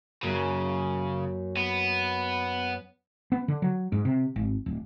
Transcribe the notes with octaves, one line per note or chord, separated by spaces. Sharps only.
F#2 C#3 A#3 F#4
B3
B3
D3
F#3
G#2
C3
G#1
D1